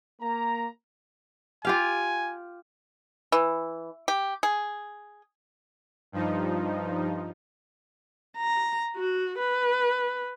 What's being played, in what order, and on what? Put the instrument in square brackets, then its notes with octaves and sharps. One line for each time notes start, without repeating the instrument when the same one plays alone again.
[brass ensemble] A#3 A#5
[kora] F4 G4 F5 [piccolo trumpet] G#5
[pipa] E3
G4
G#4
[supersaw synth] G2 F3 D#4
[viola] A#5
F#4
B4